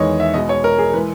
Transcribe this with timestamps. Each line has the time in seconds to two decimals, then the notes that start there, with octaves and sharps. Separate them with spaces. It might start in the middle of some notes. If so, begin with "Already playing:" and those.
Already playing: E2 D#3 G#3 C#5 D#5
0.20 E5
0.34 B2 G#3 D#5
0.49 C#5
0.64 A#4
0.79 G#4
0.93 E3 G#3 B4